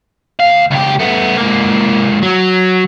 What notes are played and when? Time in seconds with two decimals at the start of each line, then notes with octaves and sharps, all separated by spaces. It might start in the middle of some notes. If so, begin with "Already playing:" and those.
0.40 D#2 F5
0.71 C#2 G4
1.00 A3 B3
1.38 G#2 A#3
2.23 F#3